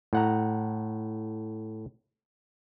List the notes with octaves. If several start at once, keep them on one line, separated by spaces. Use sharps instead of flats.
A2 F#5 A#5